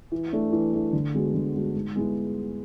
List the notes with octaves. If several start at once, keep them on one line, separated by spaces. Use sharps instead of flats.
E3
A3 D4
E3
A3 D4
D3
G#3 B3 F#4
D3
G#3 B3 F#4
G#2
G#3 B3 E4 G#4